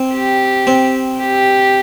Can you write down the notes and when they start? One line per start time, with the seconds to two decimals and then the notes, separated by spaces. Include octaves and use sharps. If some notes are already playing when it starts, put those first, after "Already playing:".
Already playing: C4
0.13 G4
0.67 C4
1.20 G4